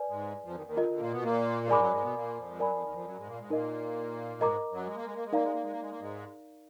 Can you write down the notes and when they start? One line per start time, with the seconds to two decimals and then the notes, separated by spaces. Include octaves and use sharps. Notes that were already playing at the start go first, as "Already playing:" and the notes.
Already playing: B4 D5 G#5
0.09 G#2 G#3
0.44 F2 F3
0.55 D#2 D#3
0.66 D#2 D#3
0.77 D3 F4 A#4 D#5
0.89 D3
1.00 A#2 A#3
1.12 B2 B3
1.23 A#2 A#3
1.64 A#3
1.68 G#2 G#3 A#4 D5 G#5 B5 D6
1.80 F#2 F#3
1.91 G#2 G#3
2.02 B2 B3
2.14 A#2 A#3
2.37 F2 F3
2.49 G#3
2.59 F#2 F#3 A#4 D5 G#5 B5
2.71 F2 F3
2.82 D#2 D#3
2.94 F2 F3
3.05 F#2 F#3
3.16 G#2 G#3
3.27 A#2 A#3
3.39 G#2 G#3
3.50 A#2 A#3 D#4 A#4 D#5
4.41 G#2 G#3 A#4 D#5 A#5 D6
4.72 F#2 F#3
4.87 G#3
4.96 A#3
5.05 G#3
5.15 A#3
5.24 G#3
5.32 A#3 D#4 A#4 D5 F5 A#5
5.43 G#3
5.53 A#3
5.62 G#3
5.71 A#3
5.81 G#3
5.91 A#3
6.00 G#2 G#3